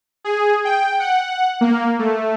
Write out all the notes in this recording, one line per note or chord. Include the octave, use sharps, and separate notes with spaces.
G#4
G5
F#5
A#3
A3